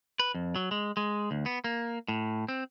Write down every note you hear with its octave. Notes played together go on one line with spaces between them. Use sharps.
B4
F2
F#3
G#3
G#3
D2
B3
A#3
A2
C4